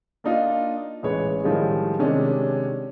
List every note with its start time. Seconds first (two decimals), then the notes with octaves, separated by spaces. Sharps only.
0.24 A#3 D4 D#4 F4
1.03 A1 G#3 B4 C#5
1.44 A2 D#3 F3 G3 G#3
1.99 C3 D#3 G#3 C#4 D4